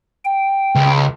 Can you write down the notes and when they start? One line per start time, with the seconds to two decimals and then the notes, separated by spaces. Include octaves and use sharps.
0.25 G5
0.75 C#2